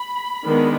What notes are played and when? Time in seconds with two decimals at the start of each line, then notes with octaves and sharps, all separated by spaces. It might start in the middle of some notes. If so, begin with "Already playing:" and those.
Already playing: B5
0.45 D#3 G#3 B3 D4